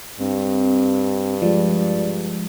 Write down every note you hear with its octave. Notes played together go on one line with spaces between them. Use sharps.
G2 C4
F3 G#3 D5